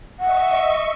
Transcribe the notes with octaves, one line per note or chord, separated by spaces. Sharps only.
D#5 E5 F#5 C#6